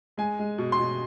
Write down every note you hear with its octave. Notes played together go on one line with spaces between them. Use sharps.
G#3 G#5
G#3
B2
C6
B2